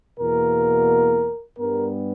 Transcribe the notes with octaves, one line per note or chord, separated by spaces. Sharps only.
E2 B2 A#3 A#4
G2 G3 B3 A#4